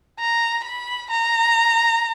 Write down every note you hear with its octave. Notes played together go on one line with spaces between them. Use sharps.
A#5
B5
A#5